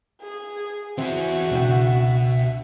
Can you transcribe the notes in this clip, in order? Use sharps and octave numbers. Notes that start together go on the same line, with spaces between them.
G#4
E3 C4 E4 F#4 G#4 E5
C#2 B2 D4 E5 G5